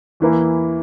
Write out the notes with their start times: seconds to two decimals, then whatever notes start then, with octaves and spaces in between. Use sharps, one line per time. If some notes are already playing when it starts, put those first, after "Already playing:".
0.20 E2 E3 A#3 E4